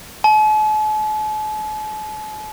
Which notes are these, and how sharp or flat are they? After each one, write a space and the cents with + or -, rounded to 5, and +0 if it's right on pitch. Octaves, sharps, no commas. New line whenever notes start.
A5 -45